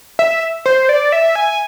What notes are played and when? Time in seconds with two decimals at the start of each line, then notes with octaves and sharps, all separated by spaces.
0.19 E5
0.66 C5
0.89 D5
1.12 E5
1.36 G#5